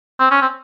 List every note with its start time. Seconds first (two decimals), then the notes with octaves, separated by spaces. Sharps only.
0.19 C4
0.31 C#4
0.42 C4